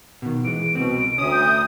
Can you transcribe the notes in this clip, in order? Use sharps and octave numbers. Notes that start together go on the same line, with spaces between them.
B2 D#3
E3 G#3 D7
C2 B2 C4
D2 C#4 D#6
G6